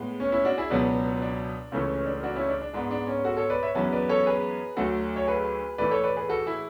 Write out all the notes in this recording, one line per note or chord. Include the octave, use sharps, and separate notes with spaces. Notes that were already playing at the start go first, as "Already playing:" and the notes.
Already playing: A2 G#3 B3
C#4
C#4 E4
D4 F#4
E4 G#4
C#2 B2 F#3 B3 D4
D4
C#2 C#3 E3 A3 C#4
C#4
D4
D4 F#4
C#4 E4
D4
D4
G#2 G#3 B3 D4
D4
C#4
F#4 A4
A4 C#5
B4 D5
C#5 E5
F#2 E3 G#3 B3
B4 D5
A4 C#5
G#4 B4
D2 D3 F#3 A3 F#4 A4
C#5
G#4 B4
A2 E3 A3 B4 D5
A4 C#5
B4 D5
G#4 B4
F#4 A4
E4 G#4